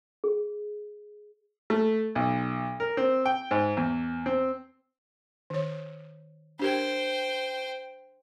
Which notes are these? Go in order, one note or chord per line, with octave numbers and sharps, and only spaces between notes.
G#4
A3
B1
A#4
C4
G5
G#2
E2
C4
D#3 C#5
D4 G4 A#4 C5 G5